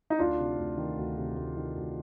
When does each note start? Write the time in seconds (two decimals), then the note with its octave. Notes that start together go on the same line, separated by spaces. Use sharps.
0.10 D#4
0.19 D2 D4 F4
0.39 C3
0.58 D2
0.78 D#3
0.98 D2
1.18 C3
1.37 D2
1.56 D#3
1.76 D2